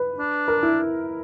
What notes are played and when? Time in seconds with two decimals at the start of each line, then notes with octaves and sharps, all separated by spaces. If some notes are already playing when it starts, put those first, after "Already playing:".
Already playing: B4
0.19 D4
0.48 A#4
0.63 E4